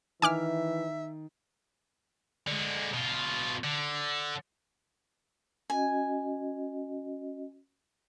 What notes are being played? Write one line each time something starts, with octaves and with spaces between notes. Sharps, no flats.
D#3 E3 E5 G#5 D6 F6
D3 G#3
B2 F4
D3
C#4 F#4 D#5 G#5